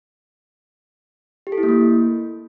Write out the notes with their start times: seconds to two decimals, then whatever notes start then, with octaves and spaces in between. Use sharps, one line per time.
1.47 G4
1.52 A4
1.58 E4
1.63 A#3
1.69 A3